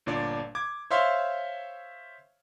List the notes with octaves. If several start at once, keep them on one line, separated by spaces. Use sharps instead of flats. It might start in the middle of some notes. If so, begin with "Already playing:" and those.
G1 A#2 D4 D5
D6 G#6
C5 C#5 E5 F5 C6